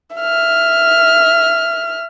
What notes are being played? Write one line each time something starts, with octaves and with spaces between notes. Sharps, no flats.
E5 F6